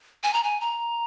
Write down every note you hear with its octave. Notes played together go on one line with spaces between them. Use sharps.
G#5
A#5
G#5
A#5